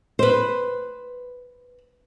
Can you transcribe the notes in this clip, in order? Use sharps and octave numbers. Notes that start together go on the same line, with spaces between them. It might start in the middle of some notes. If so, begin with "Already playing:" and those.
B4 C5